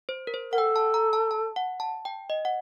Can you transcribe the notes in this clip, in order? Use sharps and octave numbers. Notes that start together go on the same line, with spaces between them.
C5
A#4
C5
A#4 F#5
A4 G5
A5
A#5
A5
A5
F#5
A5
G5
D#5
F#5